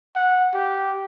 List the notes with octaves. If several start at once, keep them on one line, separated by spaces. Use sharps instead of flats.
F#5
G4